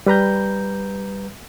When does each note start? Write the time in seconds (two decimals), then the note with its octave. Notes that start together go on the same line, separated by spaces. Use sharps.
0.07 G3 B4 A#5 G6